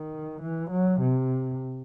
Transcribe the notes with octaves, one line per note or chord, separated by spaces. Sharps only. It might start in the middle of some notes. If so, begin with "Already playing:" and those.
Already playing: D#3
E3
F#3
C3